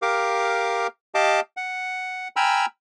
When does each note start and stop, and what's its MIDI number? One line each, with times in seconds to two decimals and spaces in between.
0.02 0.87 67
0.02 0.87 70
0.02 0.87 77
0.02 0.87 86
1.15 1.40 67
1.15 1.40 75
1.15 1.40 77
1.15 1.40 81
1.15 1.40 86
1.57 2.28 78
2.36 2.66 79
2.36 2.66 80
2.36 2.66 82
2.36 2.66 83
2.36 2.66 88
2.36 2.66 89